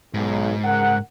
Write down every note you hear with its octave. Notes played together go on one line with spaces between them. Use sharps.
B1 G#2
C#3 A#4 F#5